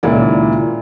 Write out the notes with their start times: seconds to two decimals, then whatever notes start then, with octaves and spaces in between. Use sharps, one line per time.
0.03 C#2 A#2 D#3 E4 D5